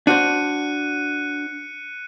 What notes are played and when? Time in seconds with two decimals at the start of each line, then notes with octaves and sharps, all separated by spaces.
0.07 D4 F#4 C5 F#6 C#7 D#7